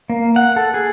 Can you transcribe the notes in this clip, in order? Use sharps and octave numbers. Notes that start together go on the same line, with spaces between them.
A#3
F#5
A4
G#4